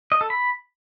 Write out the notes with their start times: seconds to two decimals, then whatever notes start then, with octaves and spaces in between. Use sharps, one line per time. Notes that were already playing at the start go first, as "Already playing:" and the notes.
0.12 D#5
0.21 A4
0.30 B5